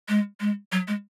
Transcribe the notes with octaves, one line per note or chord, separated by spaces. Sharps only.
G#3
G#3
F#3
G#3